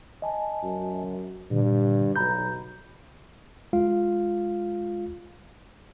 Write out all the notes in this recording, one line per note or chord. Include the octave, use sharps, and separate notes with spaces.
D#5 G#5 A5
F#2
G2 A#2 D3
B1 A#5 B5 G6
G#3 F4 F5